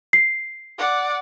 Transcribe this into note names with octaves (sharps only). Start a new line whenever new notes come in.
C7
D5 F#5